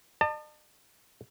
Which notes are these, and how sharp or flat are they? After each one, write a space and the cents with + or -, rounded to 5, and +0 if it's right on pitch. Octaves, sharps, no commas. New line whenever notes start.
D#5 -45 A5 +30